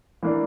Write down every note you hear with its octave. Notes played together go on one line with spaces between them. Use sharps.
E3 A#3 D4